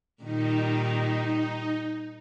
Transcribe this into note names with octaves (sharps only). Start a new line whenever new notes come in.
A#2 D#3 G3 D#4